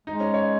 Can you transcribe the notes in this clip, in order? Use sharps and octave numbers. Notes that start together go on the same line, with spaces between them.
G#3 D#4
C#4
C#5